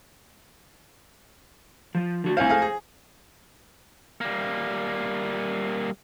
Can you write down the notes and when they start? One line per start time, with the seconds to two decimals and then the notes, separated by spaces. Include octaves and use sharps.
1.95 F3
2.24 D3 F#4
2.37 C2 E4 C5 F5 F#5 G#5
2.49 G#4 A4 F5
2.62 G#4
4.21 G3 A#3